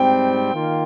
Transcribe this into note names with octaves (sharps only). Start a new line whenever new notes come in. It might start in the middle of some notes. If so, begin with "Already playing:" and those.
Already playing: G#2 G3 C4 G5
D#3 A#3 F4